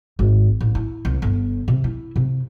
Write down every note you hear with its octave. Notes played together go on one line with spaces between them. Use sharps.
G#1
A1
E4
C2
G1
C3
E4
C3